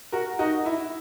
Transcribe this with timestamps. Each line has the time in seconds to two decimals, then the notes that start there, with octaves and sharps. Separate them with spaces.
0.12 F#4 A#4
0.39 D#4 F#4
0.66 E4